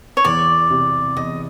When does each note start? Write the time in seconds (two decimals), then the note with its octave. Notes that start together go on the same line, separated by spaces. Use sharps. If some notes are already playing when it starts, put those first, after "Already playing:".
0.17 C#5
0.25 E2 D5
0.70 C3
1.16 E2 D#5